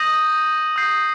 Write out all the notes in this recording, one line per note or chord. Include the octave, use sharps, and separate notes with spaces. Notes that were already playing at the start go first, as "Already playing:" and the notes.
Already playing: D#6 G6 A#6 D#7 F#7
D#6 G6 C7